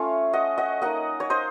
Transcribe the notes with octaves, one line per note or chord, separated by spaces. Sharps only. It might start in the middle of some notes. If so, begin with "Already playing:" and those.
Already playing: A3 C#4 F4 C#5 F5
D#5 F#5
D#5 F#5
A#3 D#4 D#5 F#5
C#5
C5 D#5